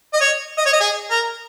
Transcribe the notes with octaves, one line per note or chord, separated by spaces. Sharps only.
D#5
C#5
D#5
C#5
D#5
G#4
A#4